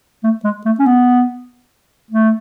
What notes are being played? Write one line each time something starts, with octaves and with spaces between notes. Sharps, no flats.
A3
G#3
A3
C#4
B3
A3